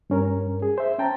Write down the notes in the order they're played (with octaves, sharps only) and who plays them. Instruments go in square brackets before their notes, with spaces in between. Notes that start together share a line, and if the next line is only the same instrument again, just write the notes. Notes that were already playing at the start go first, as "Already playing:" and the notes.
[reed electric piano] G2 C#4 A#4
G#4
C5 E5
C#4 G5 A5 A#5